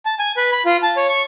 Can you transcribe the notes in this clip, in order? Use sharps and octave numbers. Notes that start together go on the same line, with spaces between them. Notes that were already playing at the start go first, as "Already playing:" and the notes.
A5
G#5
B4
B5
F4
A5
C#5
C#6